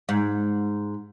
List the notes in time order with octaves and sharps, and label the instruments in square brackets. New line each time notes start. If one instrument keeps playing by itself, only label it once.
[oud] G#2